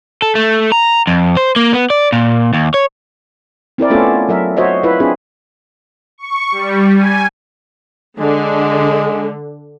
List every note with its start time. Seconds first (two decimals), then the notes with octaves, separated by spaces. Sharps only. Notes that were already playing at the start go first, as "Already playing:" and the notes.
0.22 A4
0.35 A3
0.72 A#5
1.07 F2
1.37 C5
1.56 A#3
1.73 B3
1.90 D5
2.12 A#2
2.53 D#2
2.74 C#5
3.78 C4 E4 A#4 D5
3.90 A3 B3 C#4 F4 A4
4.29 F#3 A#4 E5
4.57 F#4 C5 C#5 D#5 E5
4.83 E4 F4 B4 E5
5.00 C4 D4 F4 G#4
6.18 C#6
6.51 G3
6.95 G#5
8.19 D3 G#3